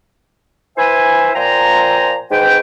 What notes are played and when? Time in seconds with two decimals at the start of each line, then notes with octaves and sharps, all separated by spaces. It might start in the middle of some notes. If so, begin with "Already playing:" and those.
0.77 E4 B4 C5 E5 G#5
1.35 A#2 F3 C5 G5 G#5 A#5
2.31 G#2 B4 G5